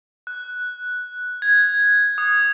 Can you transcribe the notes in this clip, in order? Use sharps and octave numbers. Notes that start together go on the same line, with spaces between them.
F#6
G#6
D#6